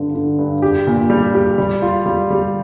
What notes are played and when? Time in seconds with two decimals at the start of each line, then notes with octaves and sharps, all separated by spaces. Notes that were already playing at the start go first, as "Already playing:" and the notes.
Already playing: G2 D3
0.15 D3
0.39 G2
0.62 G4
0.87 A#2
1.10 G3
1.35 G4
1.58 G3
1.82 F4
2.06 G3
2.30 G3